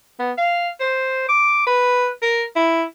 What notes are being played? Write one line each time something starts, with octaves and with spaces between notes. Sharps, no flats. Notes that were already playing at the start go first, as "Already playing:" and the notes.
B3
F5
C5
D6
B4
A#4
E4